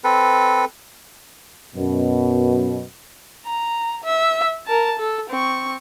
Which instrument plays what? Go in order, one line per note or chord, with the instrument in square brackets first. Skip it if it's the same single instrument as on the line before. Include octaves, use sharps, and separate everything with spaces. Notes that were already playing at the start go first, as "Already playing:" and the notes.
[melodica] C4 A4 B4
[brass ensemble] F#2 B2
[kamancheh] A#5
E5
A#4 A5
A4
C4 C#6